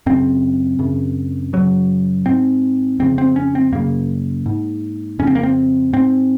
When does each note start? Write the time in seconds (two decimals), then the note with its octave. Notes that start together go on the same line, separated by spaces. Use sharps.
0.06 F#2 C#3 C4
0.79 F#2 C#3
1.53 F#2 C#3 F#3
2.26 G#2 C4
2.99 F2 C#3 C4
3.18 C4
3.36 C#4
3.55 C4
3.72 F#2 C#3 A#3
4.46 G#2
5.19 F2 C#3 C#4
5.27 C4
5.35 A#3
5.43 C4
5.93 G#2 C4